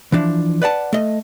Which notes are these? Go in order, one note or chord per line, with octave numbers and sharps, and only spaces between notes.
E3 F3 D4
B4 D5 F#5 A5
A3 D#5